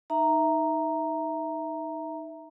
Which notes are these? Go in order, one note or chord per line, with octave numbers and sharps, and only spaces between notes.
D#4 E5 A#5